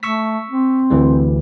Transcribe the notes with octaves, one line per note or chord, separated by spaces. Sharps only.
A3 C#6 E6 B6
C4
D2 E3 G3